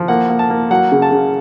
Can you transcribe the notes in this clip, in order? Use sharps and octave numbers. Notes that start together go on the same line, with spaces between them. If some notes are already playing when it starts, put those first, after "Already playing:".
Already playing: F3
A#3 F#5
A#3
A5
A#3
F#3 F#5
C#3
A5
C#3